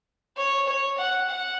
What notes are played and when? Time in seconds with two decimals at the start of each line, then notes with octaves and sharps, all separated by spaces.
0.37 C#5
0.67 C#5
0.98 F#5
1.29 F#5